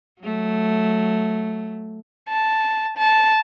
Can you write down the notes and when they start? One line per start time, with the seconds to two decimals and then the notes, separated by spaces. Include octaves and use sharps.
0.21 F#3 A3
2.28 A5
2.98 A5